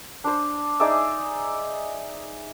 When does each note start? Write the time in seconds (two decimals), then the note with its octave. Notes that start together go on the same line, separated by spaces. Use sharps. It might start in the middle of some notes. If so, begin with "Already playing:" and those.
0.24 D4 C5
0.80 D#4 G#4 D5 E5